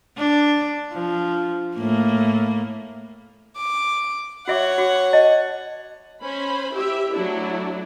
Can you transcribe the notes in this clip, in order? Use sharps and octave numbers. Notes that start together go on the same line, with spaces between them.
D4
F3
A2 A#3
D6
F#4 C#5 E5 F#5 D6
F#4 D6
D#5 A5
C#4 C5 B5
E4 G4 E5
F#3 A3 D4 E4